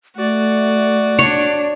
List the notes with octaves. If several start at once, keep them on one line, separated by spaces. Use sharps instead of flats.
A3 F#4 D5
D4 C#5